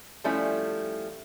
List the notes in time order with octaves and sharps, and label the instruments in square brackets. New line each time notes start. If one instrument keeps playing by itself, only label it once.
[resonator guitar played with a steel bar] F3 G3 A3 C#4 E4